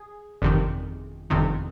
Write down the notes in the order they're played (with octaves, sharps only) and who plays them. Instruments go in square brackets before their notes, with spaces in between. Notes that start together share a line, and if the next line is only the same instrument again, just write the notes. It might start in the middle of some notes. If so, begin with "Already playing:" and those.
Already playing: [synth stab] G#4
G1 F2 C3 D#3
G1 F2 C3 D#3